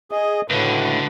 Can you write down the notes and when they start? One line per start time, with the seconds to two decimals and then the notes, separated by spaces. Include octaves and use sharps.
0.11 G#4 D#5
0.50 C#2 A2 D3 F#4 B4